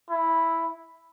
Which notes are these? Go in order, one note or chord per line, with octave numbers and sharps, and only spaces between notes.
E4